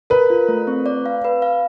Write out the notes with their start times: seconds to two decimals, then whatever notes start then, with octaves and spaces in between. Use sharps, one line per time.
0.10 A#4 B4
0.30 F4
0.48 A3
0.67 C4
0.86 D5
1.06 F5
1.24 B4
1.42 F5